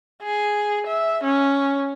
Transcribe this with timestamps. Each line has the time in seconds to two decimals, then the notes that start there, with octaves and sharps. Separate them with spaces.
0.23 G#4
0.87 E5
1.24 C#4